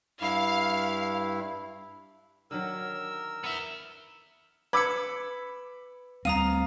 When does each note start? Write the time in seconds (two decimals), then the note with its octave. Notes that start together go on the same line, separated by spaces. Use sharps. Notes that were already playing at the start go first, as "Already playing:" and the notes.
0.21 G2 E4 F5
2.51 D3 D#3 F#3 A#4 E6
3.44 B3 E5
4.73 B4 B5 D6 E6 G#6 C#7
6.25 D2 G3 C4 F5 A#5 D#6 D#7